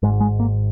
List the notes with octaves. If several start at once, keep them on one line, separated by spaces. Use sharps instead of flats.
G#1 G#2 G#3
G#3
A#3